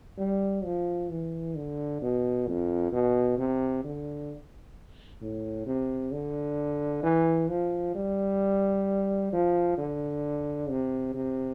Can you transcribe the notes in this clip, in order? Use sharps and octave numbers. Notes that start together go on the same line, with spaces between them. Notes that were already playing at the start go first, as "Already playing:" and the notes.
G3
F3
E3
D3
B2
F2
B2
C3
D3
A2
C3
D3
E3
F3
G3
F3
D3
C3
C3